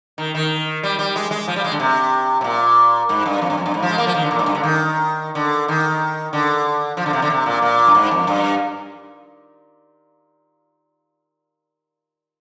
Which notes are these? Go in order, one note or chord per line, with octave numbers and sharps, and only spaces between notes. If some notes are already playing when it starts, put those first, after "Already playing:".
D#3
D#3
G3
G3
G#3
G#3
F3
G3
G#3
D3
C3
C3
A#2
G#2
G2
F2
G2
F2
G2
G#2
F3
G#3
A#3
F3
D#3
D3
A#2
G#2
G2
D3
D#3
D3
D#3
D3
F3
D3
C3
D3
C3
A#2
A#2
G2
G#2
F2
G2